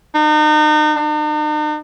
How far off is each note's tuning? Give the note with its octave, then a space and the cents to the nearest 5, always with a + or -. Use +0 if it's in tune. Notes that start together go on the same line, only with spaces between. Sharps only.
D#4 -35
D#4 -45